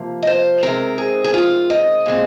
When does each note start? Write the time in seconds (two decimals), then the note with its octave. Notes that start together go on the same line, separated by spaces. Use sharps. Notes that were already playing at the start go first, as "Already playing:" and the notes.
Already playing: C3 F3 A#3
0.23 D#5
0.27 C5
0.63 C3 D#3 G#3 C4 A#4
0.98 G#4
1.24 G#4
1.34 F4
1.70 D#5
2.06 A#2 G#3 C4